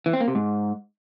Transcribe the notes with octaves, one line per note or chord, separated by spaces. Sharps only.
E3
C4
A#3
C3
G#2